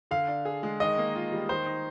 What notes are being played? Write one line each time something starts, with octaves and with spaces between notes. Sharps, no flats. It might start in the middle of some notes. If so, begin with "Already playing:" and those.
D3 F5
D4
G#4
G#3
D#3 D#5
A#3
F4
G3
D#3 C5
D#4